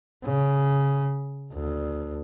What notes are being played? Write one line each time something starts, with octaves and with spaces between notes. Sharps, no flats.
C#3
D2